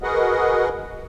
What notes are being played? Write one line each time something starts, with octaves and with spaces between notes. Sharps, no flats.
F#4 G#4 A#4 B4 D#5 F#5